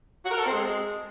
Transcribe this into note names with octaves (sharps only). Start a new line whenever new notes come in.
F#4
A#4
A4
C4
G#3